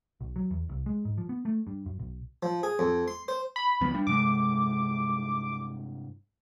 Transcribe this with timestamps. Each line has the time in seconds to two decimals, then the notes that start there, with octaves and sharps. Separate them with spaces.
0.21 B1
0.36 F#3
0.51 E2
0.69 C2
0.86 G#3
1.05 G#2
1.18 F3
1.29 B3
1.45 A3
1.67 G2
1.86 F#2
1.99 B1
2.43 F3
2.63 G#4
2.79 F2
3.08 C6
3.28 C5
3.56 B5
3.81 C#2 F3 B3
3.94 G3 D4
4.07 G2 C3 G#3 D6